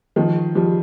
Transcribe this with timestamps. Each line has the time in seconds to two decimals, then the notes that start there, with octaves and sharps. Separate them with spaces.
0.16 D#3 F3
0.55 F3 G3